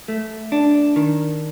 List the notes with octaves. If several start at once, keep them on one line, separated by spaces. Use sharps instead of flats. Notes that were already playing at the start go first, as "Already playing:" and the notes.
A3
D4
D#3